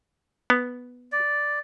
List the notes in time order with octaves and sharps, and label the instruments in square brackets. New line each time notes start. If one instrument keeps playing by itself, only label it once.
[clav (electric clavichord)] B3
[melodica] D5